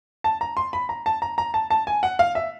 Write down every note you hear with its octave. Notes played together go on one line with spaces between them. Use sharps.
A5
A#5
C6
B5
A#5
A5
A#5
A#5
A5
A5
G#5
F#5
F5
E5